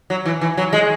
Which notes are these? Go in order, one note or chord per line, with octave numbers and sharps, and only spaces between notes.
F#3
E3
E3
F#3
G#3